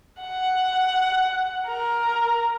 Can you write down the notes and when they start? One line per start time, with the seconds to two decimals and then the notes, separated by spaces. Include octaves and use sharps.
0.21 F#5
1.67 A#4